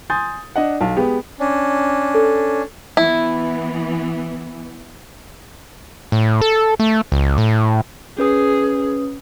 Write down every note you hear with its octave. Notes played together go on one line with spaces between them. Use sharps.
G#5 C6 D#6 G6 A6
D4 D#5 F#5
B1 F5 A5
G#3 B3 G4
C#4 D4
A4
E3 B3 E4
A2
A4
A3
C#2
A2
C#4 G#4 B4 D#6